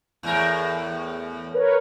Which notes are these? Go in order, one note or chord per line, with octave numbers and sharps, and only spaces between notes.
E2 A2 A#4
A#4 B4 C#5